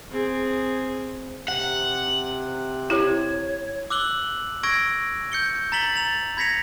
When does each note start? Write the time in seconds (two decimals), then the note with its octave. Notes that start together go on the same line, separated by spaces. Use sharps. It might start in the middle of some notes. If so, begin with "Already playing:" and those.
0.11 C4 G#4
1.48 C3 F#5
2.90 E4 G4 C#5
3.90 D6 E6 F#6 F#7 G7
4.63 C#6 E6 G#6 A#6 D7
5.32 G6 C#7 G7
5.72 A#5 A6 B6 F#7 G7
5.94 A#5 A6 F7
6.37 B5 G#6 A#6 B6 C#7 F7